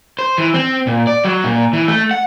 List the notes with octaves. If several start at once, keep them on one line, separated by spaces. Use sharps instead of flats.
C5
E3
C4
A#2
D5
F#3
A#2
E3
A3
F#5